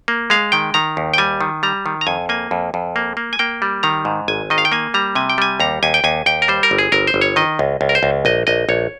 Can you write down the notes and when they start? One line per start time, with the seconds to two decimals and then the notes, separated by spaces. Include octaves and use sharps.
0.08 A#3
0.30 G#3 F5
0.52 D#3 G5
0.74 D#3 A#5
0.97 D#2
1.14 G5
1.18 G3 G#5
1.41 D#3
1.63 G3 A#5
1.86 D#3
2.01 A#5
2.07 F2 G#5
2.29 A#3 G#5
2.51 F2
2.74 F2
2.96 A#3
3.17 A#3
3.33 G#5
3.39 A#3 G5
3.62 G3
3.83 D#3 A#5
4.05 G#2
4.28 G#1 G#5
4.50 D#3 D#5
4.58 F5
4.65 G5
4.72 A#3 G#5
4.94 G3 A#5
5.15 C3 G#5
5.30 G5
5.38 G3 G#5
5.60 D#2 A#5
5.83 D#2 G#5
5.94 G5
6.04 D#2 G#5
6.26 D#2 G5
6.42 A#4
6.48 G3 C5
6.63 A#4
6.71 G1
6.78 G#4
6.92 G1 A#4
7.07 C5
7.14 G1
7.21 C#5
7.36 D#3 D#5
7.59 C#2
7.81 C#2
7.89 A#4
7.95 C5
8.03 C#2
8.25 A#1 D#5
8.47 A#1 D#5
8.69 A#1 C#5